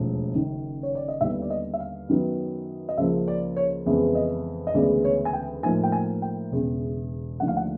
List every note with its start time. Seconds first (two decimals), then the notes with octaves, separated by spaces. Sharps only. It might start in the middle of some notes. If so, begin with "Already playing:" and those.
Already playing: E1 D#2 F3 A3
0.32 F#1 F#2 D#3
0.83 C#5
0.95 D5
1.08 D#5
1.21 D#2 D3 G3 B3 E5
1.42 D5
1.50 D#5
1.74 E5
1.80 F5
2.09 F#2 D#3 F#3 B3
2.89 D#5
2.98 C#2 C#3 F3 A#3 E5
3.28 D5
3.56 C#5
3.86 F2 C#3 E3 G#3 B3
4.15 D#5
4.67 D#5
4.74 D2 C#3 E3 G#3 B3 D5
5.04 C#5
5.25 G#5
5.33 G5
5.63 A2 F3 A#3 D#4 G#5
5.83 G5
5.92 G#5
6.22 G5
6.52 E1 E2 C#3 E3
7.40 D#2 D3 F3 A3 F#5
7.48 F5
7.57 F#5